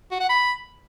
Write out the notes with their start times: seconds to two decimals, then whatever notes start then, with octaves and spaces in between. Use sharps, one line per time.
0.11 F#4
0.20 F#5
0.29 B5